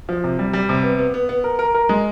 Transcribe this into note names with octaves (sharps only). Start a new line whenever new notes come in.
F3
C3
G3
G3
C3
B3
B3
B3
B3
A#4
A#4
A#4
G#3